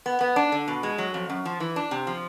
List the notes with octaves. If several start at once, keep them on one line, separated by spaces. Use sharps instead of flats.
B3
B3
D4
D3
B2
G#3
F#3
F2
F#2
F3
E3
D4
C3
F3